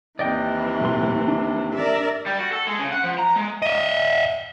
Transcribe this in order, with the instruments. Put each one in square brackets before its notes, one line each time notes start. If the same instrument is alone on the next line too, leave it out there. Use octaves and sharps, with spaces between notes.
[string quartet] D#2 C3 E3 [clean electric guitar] D5 D#5 G5
[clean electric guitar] B1 A2 C6
D4
[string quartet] A#4 D5 E5
[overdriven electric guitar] G3
F#4
A4
G#3
C#3
F#5
F3
A#5
G#3
[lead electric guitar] D#5 E5